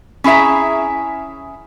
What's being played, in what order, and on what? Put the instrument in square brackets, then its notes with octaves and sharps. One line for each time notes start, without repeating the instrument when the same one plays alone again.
[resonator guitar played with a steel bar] C#4 E4 G#4 E5 A#5